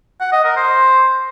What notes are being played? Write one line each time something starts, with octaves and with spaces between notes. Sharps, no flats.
F#5
D#5
A#4
C5